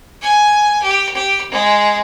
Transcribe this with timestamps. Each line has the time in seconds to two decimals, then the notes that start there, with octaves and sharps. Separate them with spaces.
0.22 G#5
0.83 G4
1.14 G4
1.51 G#3